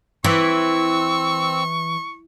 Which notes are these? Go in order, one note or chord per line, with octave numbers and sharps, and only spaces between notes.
E3 C4 C#6 E6